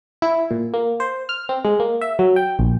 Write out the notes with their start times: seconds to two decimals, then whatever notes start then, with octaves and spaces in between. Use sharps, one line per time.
0.22 E4
0.51 A#2
0.74 A#3
1.00 C5
1.29 F6
1.49 C4
1.65 G#3
1.80 A#3
2.01 E5
2.19 F#3
2.36 G5
2.59 A#1